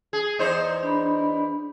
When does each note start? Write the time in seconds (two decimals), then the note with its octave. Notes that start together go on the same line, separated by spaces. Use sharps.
0.13 G#4
0.39 E2 D#4 C5
0.83 D4 B5